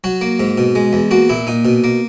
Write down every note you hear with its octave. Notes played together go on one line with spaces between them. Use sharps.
F#3 F#4
A#3
G#2
B2
G#3
E2
A#3 F#4
A#2 E4
A#2 D#4
B2
A#3